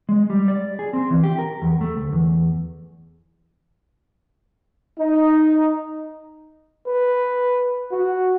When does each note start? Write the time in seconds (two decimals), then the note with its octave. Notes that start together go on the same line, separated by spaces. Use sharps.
0.09 G#3
0.30 G3
0.48 D5
0.79 G#4
0.93 C4
1.10 E3
1.23 G4
1.39 A#4
1.62 E2
1.81 A3
1.96 D2
2.13 E2
4.99 D#4
6.87 B4
7.92 F#4